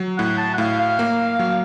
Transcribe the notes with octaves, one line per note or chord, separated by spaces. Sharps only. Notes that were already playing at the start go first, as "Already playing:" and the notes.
Already playing: F#3
A2 F#5
A5
F#5
A2 F5
F5
A#3
F#3